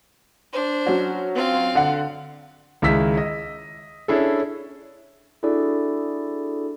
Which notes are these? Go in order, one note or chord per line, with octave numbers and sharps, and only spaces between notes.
D4 C5
F#3 C#4 F#4
C4 F4 F5
D3 F#5
C#2 D#3 G#3 E4 E6 B6
D#5
C#4 D4 E4 G#4 A4
D4 E4 F#4 G#4 A4 D5